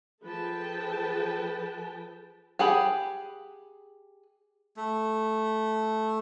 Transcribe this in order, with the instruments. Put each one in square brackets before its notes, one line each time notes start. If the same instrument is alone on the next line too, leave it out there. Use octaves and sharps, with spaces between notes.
[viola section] F3 G#4 A4 B4 G5 A5
[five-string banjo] G4 G#4 F#5 B5
[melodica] A3